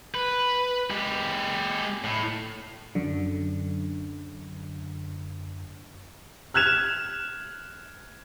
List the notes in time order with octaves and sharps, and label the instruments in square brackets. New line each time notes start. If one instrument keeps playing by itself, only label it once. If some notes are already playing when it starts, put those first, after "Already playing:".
[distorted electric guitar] B4
G#3 G4
A2
[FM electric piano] F#2 D3
[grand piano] F6 F#6 G#6 E7 F7